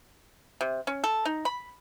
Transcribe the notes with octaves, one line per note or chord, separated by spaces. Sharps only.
C3
C#4
A4
D#4
B5